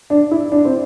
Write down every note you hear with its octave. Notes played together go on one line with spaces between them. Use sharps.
D4
E4
D4
C4